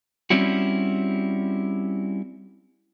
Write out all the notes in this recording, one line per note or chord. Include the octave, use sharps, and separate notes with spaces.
G3 C4 C#4 E4 F#4